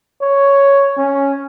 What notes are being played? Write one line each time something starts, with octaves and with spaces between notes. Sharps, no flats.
C#5
C#4